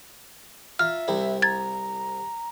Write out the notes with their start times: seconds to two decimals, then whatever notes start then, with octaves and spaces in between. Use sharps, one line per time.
0.79 F4 E5 A#5 F6
1.08 C2 C3 E4
1.42 A#5 G#6 A6